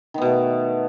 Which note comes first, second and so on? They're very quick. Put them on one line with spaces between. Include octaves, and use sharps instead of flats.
D#3 B3 B2 A3